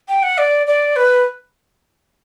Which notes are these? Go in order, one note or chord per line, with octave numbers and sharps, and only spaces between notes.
G5
F#5
D5
D5
B4